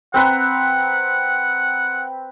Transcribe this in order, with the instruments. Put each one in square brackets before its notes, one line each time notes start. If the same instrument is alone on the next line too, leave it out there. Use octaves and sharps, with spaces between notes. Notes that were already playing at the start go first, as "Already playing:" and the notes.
[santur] C4 B4 A#5 [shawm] F#5